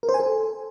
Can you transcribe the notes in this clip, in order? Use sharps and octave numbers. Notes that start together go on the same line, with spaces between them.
A#4
C5
G#5
A4